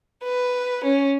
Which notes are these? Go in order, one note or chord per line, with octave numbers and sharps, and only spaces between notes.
B4
C#4